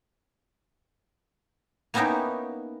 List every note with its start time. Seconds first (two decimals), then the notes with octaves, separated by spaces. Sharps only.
1.94 A#3 B3 C#4 D#4 E4 G4